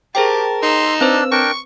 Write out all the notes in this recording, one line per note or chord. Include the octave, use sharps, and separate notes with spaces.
G4 G#4 A#4 C5 G5 A5
D#4 C6 E6
C4 D4 B4 C5
D4 A#4 G5 C#6